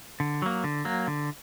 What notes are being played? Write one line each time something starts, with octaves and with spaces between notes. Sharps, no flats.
D3
F#3 A#3
D3
F#3 A#3
D3